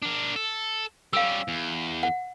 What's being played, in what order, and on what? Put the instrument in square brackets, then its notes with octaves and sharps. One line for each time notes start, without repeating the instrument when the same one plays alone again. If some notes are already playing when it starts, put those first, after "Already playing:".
[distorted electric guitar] D4 A#4
A4
[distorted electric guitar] G3 C#4 [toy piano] F5 E6
[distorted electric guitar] E2
[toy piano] F#5